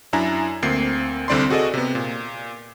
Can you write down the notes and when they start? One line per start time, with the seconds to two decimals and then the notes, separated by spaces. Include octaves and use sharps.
0.13 F#2 D4 E4 G#5 A#5
0.62 D2 A#3 C4 C7
1.28 C2 D3 C4 D5 B5 C6
1.50 F#4 G#4 A4 D5 D#5
1.74 C3 B3
1.95 A#2